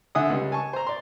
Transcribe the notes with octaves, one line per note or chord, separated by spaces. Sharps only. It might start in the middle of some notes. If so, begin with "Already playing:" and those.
D3 E5 F#5 G#5 D#6
C#2 G3
G#5 A5 C#6
C5 A#5
D5 C6